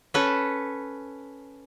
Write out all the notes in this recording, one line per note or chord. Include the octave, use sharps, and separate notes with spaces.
C#4 A4 B4